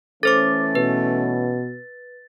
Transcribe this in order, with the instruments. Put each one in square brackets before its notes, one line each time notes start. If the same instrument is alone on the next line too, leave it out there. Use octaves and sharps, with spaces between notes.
[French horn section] E3 A3 C#4 [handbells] A4 C5 D6 [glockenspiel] A6
[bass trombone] B2 [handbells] B4